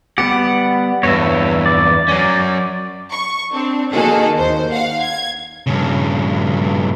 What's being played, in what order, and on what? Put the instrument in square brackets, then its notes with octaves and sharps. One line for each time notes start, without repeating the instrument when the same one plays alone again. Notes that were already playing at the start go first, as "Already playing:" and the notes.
[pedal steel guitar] G3 B3 G4 [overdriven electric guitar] F#5
[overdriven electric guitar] E2 G2 [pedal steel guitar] C#5 E5
[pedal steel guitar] D5
[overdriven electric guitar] F#3 C#4
[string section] C#6
C4 D4
D#3 A#3 F#4 G#4 A4
D#2 C5
F5 F#5
G#6
[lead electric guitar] G2 C#3